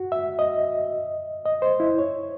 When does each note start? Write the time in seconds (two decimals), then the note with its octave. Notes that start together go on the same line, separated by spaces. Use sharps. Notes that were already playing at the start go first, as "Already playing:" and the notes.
Already playing: F#4
0.12 E5
0.39 D#5
1.45 D#5
1.62 C5
1.80 E4
1.99 C#5